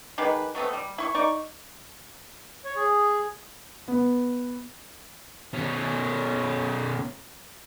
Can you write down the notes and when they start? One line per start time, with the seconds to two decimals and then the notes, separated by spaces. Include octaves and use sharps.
0.18 D#3 G#3 G4 B4
0.55 F#3 A3 B3 C4
0.73 G3
0.98 E4 C#6
1.15 D#4 D5 C#6
2.65 C#5
2.76 G#4
3.88 B3
5.53 B2 C#4